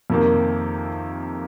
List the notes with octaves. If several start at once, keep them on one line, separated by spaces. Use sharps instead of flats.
F2 C3 D#3 A#3